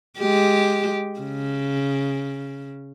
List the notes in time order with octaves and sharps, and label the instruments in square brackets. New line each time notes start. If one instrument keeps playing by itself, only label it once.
[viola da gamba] G#3 G4
C#3